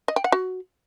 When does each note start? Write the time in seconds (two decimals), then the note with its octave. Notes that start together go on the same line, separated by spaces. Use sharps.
0.08 D#5
0.16 G5
0.24 F#5
0.32 F#4